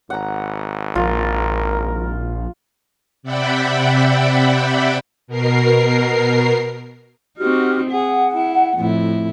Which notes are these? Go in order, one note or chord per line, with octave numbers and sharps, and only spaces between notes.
G#1 F#5 A#5
A#1 F4 A#4
C3 D5 E5 F#5 G5 B5
B2 A#4 C7
C4 D#4 F#4 G4 F6
G#4 F#5
E4
F2 A2 E4